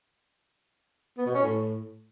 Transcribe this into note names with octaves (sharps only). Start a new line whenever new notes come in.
B3
B2
C#4
A2